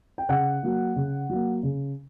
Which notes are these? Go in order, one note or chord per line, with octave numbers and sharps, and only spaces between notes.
G5
C#3 F#5
F#3 A#3
C#3
F#3 A#3
C#3